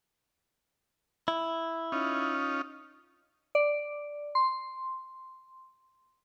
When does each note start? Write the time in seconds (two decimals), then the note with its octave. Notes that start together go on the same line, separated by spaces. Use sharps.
1.28 E4
1.92 C#4 D#4 F4
3.55 D5
4.35 C6